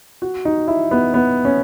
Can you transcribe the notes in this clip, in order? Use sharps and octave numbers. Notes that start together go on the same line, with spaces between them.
F#4
D#4
E4
B3
B3
C#4